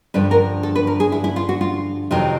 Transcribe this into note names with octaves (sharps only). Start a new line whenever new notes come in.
G2 D3 F3 B4
A#4
A4
B4
A#4
G#4
E4
E4
F4
F#4
F4
F2 C3 D#3 F#3 F4